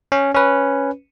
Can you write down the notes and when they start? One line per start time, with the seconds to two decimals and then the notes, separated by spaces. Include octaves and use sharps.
0.12 C#4
0.34 C#4 B4